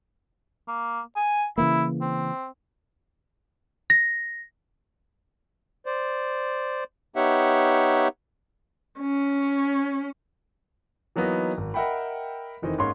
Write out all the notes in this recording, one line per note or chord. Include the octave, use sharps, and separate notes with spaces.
A#3
G#5
C#3 E3 A#3 E4
C4
A#6
C5 D5
B3 D#4 G4 C#5 E5 F#5
C#4
E3 F#3 A#3 B3 D#4 D#5
G#1
A#4 D#5 E5 F#5 G5 B5
F1 D#3 E3 C4 D#5
G#2 A#3 C#4 C#5 C6